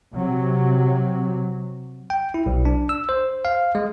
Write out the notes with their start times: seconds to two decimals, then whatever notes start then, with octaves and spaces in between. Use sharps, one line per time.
0.16 C3 F#3
2.10 G5
2.34 E4
2.46 B1
2.65 D4
2.89 E6
3.09 C5
3.45 F5
3.75 G#3